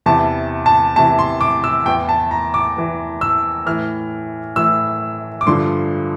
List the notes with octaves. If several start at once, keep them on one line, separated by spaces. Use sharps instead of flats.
E2 C3 E3 A5
A5
E2 C3 E3 A5
C6
D6
E6
E2 E3 G5
A5
A#5
D6
E2 E3
E6
A2 E3 F6
A2 E3 E6
D6
G2 D3 F3 C6